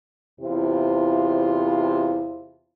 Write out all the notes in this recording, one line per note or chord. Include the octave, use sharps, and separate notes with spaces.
E2 C3 E4 F4 C5